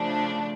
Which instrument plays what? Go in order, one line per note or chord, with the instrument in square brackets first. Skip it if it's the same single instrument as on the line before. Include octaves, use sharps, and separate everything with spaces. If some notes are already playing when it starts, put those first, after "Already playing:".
Already playing: [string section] C#3 F3 A3 D4